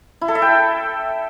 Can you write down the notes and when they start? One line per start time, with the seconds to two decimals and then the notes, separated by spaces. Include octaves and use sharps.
0.21 E4
0.28 A4
0.35 E5
0.42 G5